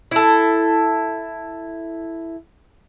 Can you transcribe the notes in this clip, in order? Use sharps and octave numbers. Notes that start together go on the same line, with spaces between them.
E4 A4